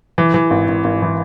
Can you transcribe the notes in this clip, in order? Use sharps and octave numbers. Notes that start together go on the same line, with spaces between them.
E3
E3
G#1
G#1
G#1
E3